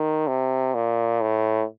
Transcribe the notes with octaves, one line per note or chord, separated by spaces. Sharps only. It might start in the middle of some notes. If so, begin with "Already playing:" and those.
Already playing: D#3
C3
A#2
A2